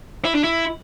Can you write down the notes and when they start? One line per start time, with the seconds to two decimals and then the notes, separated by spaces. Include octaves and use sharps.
0.25 E4
0.35 D4
0.44 E4